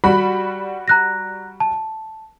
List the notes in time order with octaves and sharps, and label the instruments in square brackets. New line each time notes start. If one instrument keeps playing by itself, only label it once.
[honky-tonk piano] G3 F#4 B5
[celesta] A#5 F#6 A#6
A5